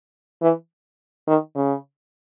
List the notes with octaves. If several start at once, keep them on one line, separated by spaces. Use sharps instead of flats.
E3
D#3
C#3